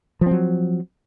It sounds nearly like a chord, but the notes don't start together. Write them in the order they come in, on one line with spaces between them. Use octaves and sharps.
F3 C4 F#3